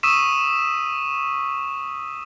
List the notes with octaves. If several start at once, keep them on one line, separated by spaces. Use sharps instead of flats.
C#6 D#6 E6 B6 D#7 E7